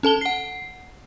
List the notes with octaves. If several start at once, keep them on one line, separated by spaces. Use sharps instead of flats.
C#4 A4 A5 G7
F#5 C7